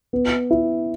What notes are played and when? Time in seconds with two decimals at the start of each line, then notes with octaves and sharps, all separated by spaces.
0.13 B3
0.51 E4